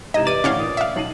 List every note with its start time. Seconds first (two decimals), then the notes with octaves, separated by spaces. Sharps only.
0.14 G#2 C3 E3 D#5 A#5 G#6 E7
0.27 G4 B4 D5 D#5 D#7
0.44 G1 A2 E3 C#4 C#5 F5 F#5 G7
0.59 A#2 D#6 A6
0.77 E5 F5
0.96 B1 D#4 C7 D#7 F#7